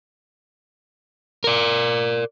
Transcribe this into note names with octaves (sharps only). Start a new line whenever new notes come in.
A#4 D5